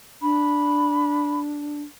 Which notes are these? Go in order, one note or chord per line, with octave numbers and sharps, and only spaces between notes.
D4 B5